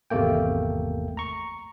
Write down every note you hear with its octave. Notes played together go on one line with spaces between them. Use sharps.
G#1 E2 C3 A3 A#3 G5
A#5 C#6